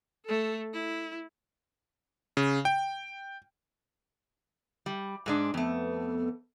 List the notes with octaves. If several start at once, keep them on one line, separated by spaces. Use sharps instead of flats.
A3 A4
E4
C#3
G5
G3
G#2 G#3 D4
F2 A3 B3